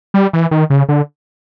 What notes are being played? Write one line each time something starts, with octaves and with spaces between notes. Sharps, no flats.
G3
E3
D#3
C#3
D3